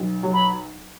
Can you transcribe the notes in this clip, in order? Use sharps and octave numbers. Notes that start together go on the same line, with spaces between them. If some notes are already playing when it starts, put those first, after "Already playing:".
Already playing: B1
F#3
B5